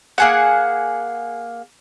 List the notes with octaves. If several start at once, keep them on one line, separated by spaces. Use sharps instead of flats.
A#3 G#4 F#5